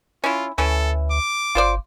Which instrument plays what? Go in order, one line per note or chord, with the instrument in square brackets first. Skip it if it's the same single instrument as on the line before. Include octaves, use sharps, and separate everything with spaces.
[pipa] C#4 E4 [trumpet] F4
[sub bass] D2 [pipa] E3 C#4 [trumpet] A4
[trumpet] D6
[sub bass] G1 [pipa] F4 C5 D5